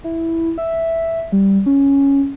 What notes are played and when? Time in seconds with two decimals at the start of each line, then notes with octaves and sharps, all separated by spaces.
0.04 E4
0.58 E5
1.32 G3
1.66 C#4